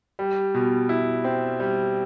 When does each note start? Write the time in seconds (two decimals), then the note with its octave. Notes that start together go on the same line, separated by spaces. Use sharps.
0.19 G3
0.54 B2
0.89 E4
1.24 C4
1.60 G3